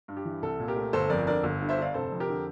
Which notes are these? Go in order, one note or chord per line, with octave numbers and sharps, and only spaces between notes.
G2
G4
E3
C2 A4
A#2
G4 A#4
A3
G1 A4 C5
F2 A#4 D5
D3 A#4 D5
G1
G2
C5 E5
D3 D5 F5
F1 A4 C5
F2
G4 A#4
D3